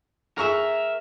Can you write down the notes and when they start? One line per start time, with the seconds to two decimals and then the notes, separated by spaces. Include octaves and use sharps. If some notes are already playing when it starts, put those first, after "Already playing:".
0.38 G#4 A#4 E5 C#6